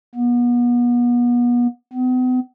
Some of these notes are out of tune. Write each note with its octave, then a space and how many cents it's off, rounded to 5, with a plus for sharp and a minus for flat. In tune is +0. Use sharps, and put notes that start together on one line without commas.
B3 -35
B3 +40